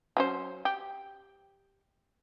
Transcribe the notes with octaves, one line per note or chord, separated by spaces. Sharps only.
F#3 C#4 C5
G4